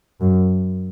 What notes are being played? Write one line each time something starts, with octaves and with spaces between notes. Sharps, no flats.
F#2